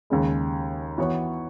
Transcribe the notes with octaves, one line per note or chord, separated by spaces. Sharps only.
D#2 C#3 G#3
E3 B3 F#4 C#5